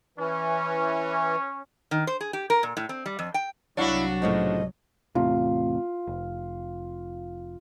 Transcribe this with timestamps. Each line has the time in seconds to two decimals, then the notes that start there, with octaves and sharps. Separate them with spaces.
0.18 E3 C#4
1.91 D#3
2.07 C5
2.21 G#4
2.33 G4
2.50 A#4
2.63 A#2
2.77 A2
2.89 C4
3.06 G3
3.19 F2
3.34 G5
3.77 C2 F#3 D4 E4 F#4 C#5 F5 F#5
4.22 A2 C#3 F3 D#5
5.15 E2 A2 C3 F4
6.07 F1